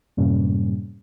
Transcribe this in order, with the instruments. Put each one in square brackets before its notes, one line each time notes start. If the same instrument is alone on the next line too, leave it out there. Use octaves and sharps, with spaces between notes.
[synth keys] F#2 A2 C3 G3 A#3 C#4